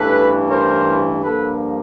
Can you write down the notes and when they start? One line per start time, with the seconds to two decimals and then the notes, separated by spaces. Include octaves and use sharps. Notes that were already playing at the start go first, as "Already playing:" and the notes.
Already playing: A1 G2 E3 A4 B4
0.49 A#4 C5
1.22 G2 D3 F3 A#3 A4 B4